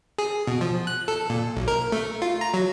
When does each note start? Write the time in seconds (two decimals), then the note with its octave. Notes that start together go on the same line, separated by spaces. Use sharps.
0.19 G#4
0.47 B2
0.61 F3
0.87 F#6
1.08 A4
1.29 A#2
1.56 B1
1.68 A#4
1.92 A3
2.22 F4
2.41 A#5
2.54 F#3